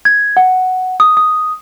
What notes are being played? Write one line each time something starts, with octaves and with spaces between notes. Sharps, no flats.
G#6
F#5
D#6
D#6